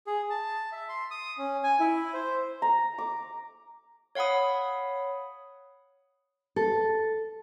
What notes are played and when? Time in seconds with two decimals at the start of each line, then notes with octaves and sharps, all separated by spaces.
0.07 G#4
0.30 A5
0.72 E5
0.89 C6
1.11 D#6
1.38 C#4
1.64 G#5
1.80 E4
2.14 C5
2.62 A#5
2.98 D6
4.15 C#5 F5 F#5 B5 D#6
6.56 A4